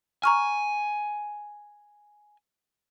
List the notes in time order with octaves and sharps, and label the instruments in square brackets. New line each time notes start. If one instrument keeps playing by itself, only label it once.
[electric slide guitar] G#5 [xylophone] A#5 C#6 F6